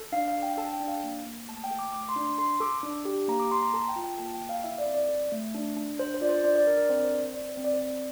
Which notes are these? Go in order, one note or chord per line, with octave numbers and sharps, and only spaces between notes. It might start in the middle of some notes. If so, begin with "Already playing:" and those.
Already playing: A4
D4 F5
F5
D4
G5
G5
A4 A5
G5
D4
F5
A#3
A#3
A3 A5
G5
A4
D6
A3 D6
C6
D4
C6
A4 C6
A4 D6
D4
G4
A#3 A#5
D6
A#3 C6
A#5
A4 A5
G5
F4
G5
A#3 A5
G5
A#3
F5
F5
E4 E5
D5
C4
D5
A4
A3
D4
D4
D4 C5
C5
F4 D5
C5
D4 D5
D5
D4 A#4
A#4
D5
C4 C5
C5
A4
C5
C4 D5
C5
C4
D5
C5
C4 D5